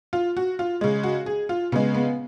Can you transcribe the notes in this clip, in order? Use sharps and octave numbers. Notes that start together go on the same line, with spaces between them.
F4
F#4
F4
C#3 G#3
F#4
G#4
F4
C#3 G#3 B3
B3